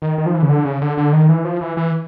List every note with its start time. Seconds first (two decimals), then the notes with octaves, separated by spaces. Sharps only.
0.02 D#3
0.18 D#3
0.26 F3
0.34 E3
0.43 C#3
0.49 D3
0.65 C#3
0.81 D3
0.97 D3
1.13 D#3
1.29 E3
1.45 F3
1.61 E3
1.77 E3